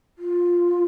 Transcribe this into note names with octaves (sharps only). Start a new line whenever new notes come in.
F4